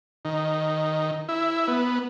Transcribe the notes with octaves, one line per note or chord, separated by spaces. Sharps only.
D#3
E4
B3